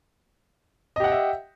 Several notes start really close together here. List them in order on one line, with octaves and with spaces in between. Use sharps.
D#5 G4 F#5 G5 E5